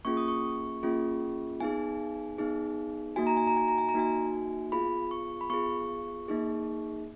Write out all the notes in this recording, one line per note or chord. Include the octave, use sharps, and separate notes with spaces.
A#3 C#4 F4 G#4 C#6
D#6
C#6
A#3 C#4 F4 G#4
B3 D#4 G#4 G#5
B3 D#4 G#4
A#3 D#4 F#4 G#5
A#5
G#5
A#5
G#5
A#5
G#5
A#5
A#3 D#4 F#4 G#5
B3 F4 G#4 B5
C#6
B5
B3 F4 G#4 C#6
A#3 D#4 G#4